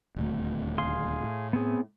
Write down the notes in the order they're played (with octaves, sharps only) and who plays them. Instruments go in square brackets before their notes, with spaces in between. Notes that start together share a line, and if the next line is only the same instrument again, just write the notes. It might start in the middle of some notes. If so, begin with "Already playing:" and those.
[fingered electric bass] D#1 D2 A3
[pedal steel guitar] G#4 F5 C6
[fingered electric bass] A2
[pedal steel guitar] B3 C4 G#4